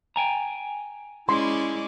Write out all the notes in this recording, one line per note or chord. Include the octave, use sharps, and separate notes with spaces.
G5 G#5 A#5
G#3 C#4 E4 D5 C6